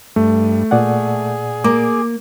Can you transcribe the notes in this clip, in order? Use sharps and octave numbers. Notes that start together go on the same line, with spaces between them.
G2 A3
A#2 G#4 D5 F#5
A#3 D6